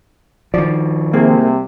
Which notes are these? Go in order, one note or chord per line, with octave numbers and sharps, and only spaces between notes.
D#3 F3 D5
C2 C3 A#3 C4 G#4